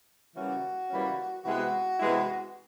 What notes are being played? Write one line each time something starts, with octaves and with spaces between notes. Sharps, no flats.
C#3 E3 G3 A#3 C#4 F#4
C#3 E3 G3 A#3 C#4
C3 E3 G#3 B3 E4 F#4
C3 E3 G#3 B3 E4